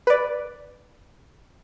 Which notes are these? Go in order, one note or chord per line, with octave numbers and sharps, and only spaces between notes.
B4 D5